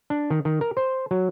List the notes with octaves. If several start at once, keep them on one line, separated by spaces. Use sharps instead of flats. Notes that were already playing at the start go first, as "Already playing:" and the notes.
D4
D#3
D#3
A#4
C5
F#3